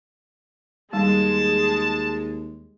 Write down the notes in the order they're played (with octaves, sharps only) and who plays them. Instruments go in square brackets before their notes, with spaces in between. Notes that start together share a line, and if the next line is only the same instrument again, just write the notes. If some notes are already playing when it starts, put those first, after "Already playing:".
[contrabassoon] D#2 [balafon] G3 [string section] G#3 [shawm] A5